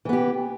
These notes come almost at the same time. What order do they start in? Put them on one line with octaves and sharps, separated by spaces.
E3 B3 G4